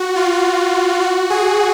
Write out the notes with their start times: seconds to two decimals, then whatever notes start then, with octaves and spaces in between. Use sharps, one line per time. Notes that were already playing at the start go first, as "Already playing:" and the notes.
Already playing: F#4
0.16 F4
1.01 F#4
1.30 G#4